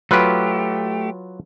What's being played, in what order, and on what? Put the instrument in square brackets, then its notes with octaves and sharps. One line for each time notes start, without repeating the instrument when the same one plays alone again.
[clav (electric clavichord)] F#3 F4 B4 [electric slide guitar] A3 G4